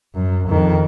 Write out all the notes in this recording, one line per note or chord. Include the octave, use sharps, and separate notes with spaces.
F#2
F2 D#3